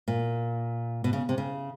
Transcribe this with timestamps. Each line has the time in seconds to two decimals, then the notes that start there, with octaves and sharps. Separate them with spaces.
0.08 A#2
1.04 B2
1.13 C#3
1.29 C3
1.38 C#3